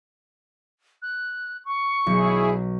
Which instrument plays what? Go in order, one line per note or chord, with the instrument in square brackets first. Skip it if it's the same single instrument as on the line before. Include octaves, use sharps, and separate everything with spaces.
[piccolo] F#6
C#6
[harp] B1 [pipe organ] E4 G#4